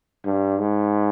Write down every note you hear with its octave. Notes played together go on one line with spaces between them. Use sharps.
G2
G#2